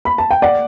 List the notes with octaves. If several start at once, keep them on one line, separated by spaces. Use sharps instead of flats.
B5
A5
G5
D5 F#5